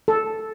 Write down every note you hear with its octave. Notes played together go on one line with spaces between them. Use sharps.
A4